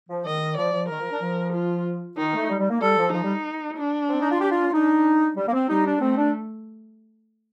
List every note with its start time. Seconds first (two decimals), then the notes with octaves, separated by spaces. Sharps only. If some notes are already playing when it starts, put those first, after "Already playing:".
0.09 F3
0.26 D#3 D#5
0.58 F3 D5
0.73 F3
0.89 D#3 A#4
1.00 F3
1.12 D4
1.22 F3
1.54 F4
2.18 D#3 D#4
2.34 A3
2.50 G3
2.60 G3
2.70 A#3
2.81 G3 A4
2.97 F3
3.13 F3 D#4
3.24 G3
3.78 D4
4.10 C4
4.20 D#4
4.30 F4
4.40 G4
4.51 F4
4.73 D4 D#4
5.37 G3
5.48 A#3
5.53 C4
5.69 G3 D#4
5.85 D4
6.01 A3 C4
6.16 D4